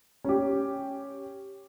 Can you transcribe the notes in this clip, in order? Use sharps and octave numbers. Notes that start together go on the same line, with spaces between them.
C#4 G4